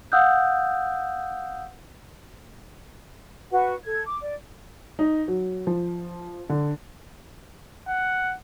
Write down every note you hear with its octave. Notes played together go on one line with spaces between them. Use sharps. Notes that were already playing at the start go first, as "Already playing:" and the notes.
F5 F#5 D#6 E6 F#6 G6
F#4 B4 F#5
A4 G#6
D6
D5
D#4
F#3
F3
D3
F#5